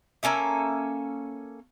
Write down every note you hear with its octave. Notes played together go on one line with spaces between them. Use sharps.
A#3 C#4 A4 E5